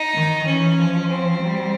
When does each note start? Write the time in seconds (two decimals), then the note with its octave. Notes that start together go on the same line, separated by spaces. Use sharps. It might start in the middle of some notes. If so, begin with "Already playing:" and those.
Already playing: D#4
0.14 D#3
0.46 E3 C#4
0.79 F3
1.10 C4
1.42 G3